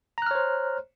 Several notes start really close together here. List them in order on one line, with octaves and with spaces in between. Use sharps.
A#5 F#6 F6 C#5 C5